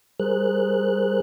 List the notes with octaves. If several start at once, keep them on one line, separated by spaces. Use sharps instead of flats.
G3 G#4 A#4 C5 F#6